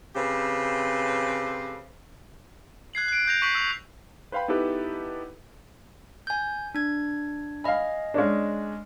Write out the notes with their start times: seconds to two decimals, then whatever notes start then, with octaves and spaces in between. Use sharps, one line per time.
0.16 C#3 C4 G4 A4 B4 C5
2.93 F#6 G#6 C7 F#7
3.08 F#6 D7
3.27 G6 A#6 F7
3.42 C#6 G6 B6 C7 F#7
3.55 E6 G6 F7
4.32 B4 C5 F5 G5 B5
4.48 B3 D#4 E4 G4 A4 B4
6.27 G#5 G6
6.75 D4 G#6
7.64 D#5 F5 G#5 B5
8.14 G#3 C#4 D4